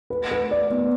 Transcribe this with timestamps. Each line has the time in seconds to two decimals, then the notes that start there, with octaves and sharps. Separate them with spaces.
0.10 B4
0.31 B4
0.51 D5
0.70 B3